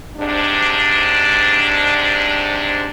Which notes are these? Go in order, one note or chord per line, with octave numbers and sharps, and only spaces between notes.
G#2 C3 D4